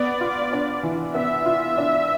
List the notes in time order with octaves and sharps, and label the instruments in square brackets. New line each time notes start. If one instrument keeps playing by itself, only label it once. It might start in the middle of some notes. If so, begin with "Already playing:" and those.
Already playing: [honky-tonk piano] B3 [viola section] D5
[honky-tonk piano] F4
D4
E3
[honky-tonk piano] B3 [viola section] E5
[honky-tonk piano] F4
D4